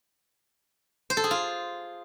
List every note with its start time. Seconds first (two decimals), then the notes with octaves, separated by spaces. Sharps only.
1.10 C5
1.17 A4
1.24 G#4
1.31 F4